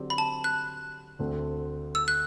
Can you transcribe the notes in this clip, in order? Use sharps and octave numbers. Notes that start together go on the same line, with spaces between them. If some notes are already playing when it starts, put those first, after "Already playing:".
Already playing: D3 F#3 C4 G4 D5
B5
A5
F#6
D2 D3 A3 C4
E6
F#6